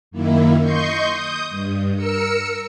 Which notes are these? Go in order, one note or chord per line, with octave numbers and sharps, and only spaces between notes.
F#2 D#3 A#3 E4
D#5 C6 C#6 G6
D#6 G6
G2
A#4 E6 C#7